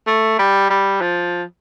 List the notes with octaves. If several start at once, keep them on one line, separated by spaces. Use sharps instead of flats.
A3
G3
G3
F3